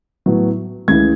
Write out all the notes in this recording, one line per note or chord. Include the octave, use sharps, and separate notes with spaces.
A2 F#3 B3
C#2 C#3 E3 A3 G#6